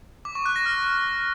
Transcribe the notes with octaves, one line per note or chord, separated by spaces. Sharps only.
D6
C#6
F#6
A#6
F6